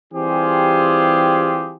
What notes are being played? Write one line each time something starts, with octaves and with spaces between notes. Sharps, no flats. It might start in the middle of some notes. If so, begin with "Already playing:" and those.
E3 G3 C4 F4 G4 G#4